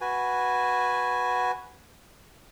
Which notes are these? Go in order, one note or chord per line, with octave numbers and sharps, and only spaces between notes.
F#4 B4 G#5